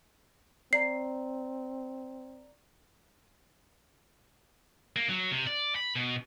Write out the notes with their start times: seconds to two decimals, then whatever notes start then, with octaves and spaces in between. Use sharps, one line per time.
0.73 C4 D5 A#5 C7
4.96 A#3
5.09 F#3
5.31 C3
5.47 D5
5.75 B5
5.95 B2